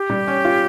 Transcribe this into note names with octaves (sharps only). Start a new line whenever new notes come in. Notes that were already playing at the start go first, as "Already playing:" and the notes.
Already playing: G4
G3
C#4
F4